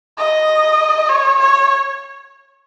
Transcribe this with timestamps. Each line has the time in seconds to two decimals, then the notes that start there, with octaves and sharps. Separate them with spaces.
0.18 D#5
1.09 C#5
1.39 C#5